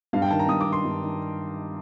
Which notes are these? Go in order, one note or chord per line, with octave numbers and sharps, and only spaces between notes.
G2 F5
G5
D#3 A5
A#5
G2 D#6
D6
D#3
C6
G2
D#3